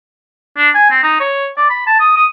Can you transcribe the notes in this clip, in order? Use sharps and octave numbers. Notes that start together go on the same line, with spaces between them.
D4
G#5
C4
D#4
C#5
D5
B5
A5
D#6
D#6